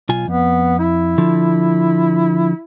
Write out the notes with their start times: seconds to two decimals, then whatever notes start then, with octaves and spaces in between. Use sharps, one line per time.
0.09 B1 F4 G#5
0.28 F2 B3
0.79 E4
1.18 D3 F3